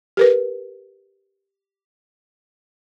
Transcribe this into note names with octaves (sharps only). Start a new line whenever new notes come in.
G4 A#4 B4